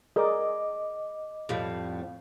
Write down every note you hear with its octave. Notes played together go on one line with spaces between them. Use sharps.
G#4 A#4 D5 D#5 D6
F2 A2 G3